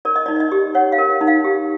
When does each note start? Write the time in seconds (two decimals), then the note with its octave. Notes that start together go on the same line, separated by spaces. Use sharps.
0.05 A#4 D5
0.16 D#5
0.26 D#4 D5
0.36 D5
0.40 D#5
0.52 G4
0.75 C#5 F#5
0.92 F5
0.98 A#4
1.21 D#4
1.27 F5
1.44 G4